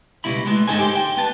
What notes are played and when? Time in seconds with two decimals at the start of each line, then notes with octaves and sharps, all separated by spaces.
0.24 C#2 B2 G3 E4 B5
0.46 G#3 A3 B3
0.67 G#2 D3 D#4 A4 C5 G#5
0.79 G4 C5
0.95 G5
1.17 B3 A5